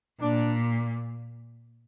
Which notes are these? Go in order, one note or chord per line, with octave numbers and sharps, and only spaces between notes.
A#2 D4